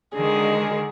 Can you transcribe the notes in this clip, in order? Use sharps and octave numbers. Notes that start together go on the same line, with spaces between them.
D3 D#3 G#3 G#4